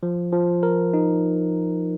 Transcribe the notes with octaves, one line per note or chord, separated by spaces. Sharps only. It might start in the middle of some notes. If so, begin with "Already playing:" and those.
F3
F3
A#4
D#4